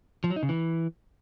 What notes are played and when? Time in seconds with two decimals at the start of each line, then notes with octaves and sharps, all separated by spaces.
0.24 F3
0.30 F#3
0.36 D#4
0.43 C#3
0.49 E3